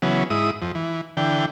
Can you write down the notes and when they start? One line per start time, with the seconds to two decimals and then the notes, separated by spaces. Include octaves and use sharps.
0.02 C#3 E3 F#3 B3
0.30 G#2 E4 D#6
0.62 F2
0.75 E3
1.17 D3 E3 G5